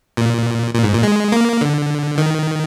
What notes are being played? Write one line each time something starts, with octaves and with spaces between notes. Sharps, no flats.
A#2
A#2
G#2
A#2
G#3
A#3
D3
D#3